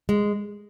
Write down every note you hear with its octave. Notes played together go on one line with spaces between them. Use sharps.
G#3